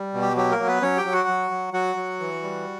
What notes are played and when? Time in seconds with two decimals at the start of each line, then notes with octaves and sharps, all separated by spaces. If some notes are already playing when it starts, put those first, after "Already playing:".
Already playing: G3
0.14 B2
0.21 G4
0.37 F#3 G4
0.51 A#3 A#4
0.59 F#3
0.67 B3 B4
0.82 F#3 C#4 C#5
0.97 G4 G5
1.05 F#3
1.12 F#4 F#5
1.28 F#3
1.51 F#3
1.73 F#3 F#4 F#5
1.96 F#3
2.20 E3
2.43 G3